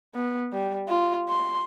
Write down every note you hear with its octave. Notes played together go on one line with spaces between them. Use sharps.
B3
G3
F4
C6